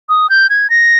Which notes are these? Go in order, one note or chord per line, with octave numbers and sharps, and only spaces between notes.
D#6
G6
G#6
A#6